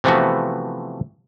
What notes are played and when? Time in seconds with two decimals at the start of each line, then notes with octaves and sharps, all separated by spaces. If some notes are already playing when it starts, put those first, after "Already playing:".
0.04 C3 E3 F3 A3 B3 F#4